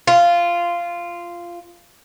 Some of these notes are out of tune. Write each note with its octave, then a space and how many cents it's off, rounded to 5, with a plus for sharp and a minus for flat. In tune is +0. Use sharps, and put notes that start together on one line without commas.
F4 -10